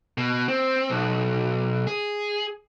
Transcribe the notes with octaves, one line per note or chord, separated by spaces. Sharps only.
B2
C4
B1
G#4